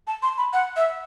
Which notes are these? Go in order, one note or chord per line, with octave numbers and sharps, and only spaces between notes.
A5
C6
B5
F#5
E5